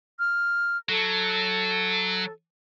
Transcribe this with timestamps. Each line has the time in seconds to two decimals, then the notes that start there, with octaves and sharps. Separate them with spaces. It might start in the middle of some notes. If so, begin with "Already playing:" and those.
0.19 F6
0.89 F#3 A4